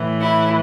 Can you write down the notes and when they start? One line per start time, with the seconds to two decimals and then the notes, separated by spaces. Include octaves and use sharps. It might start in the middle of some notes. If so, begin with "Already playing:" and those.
Already playing: A2 E3
0.20 E4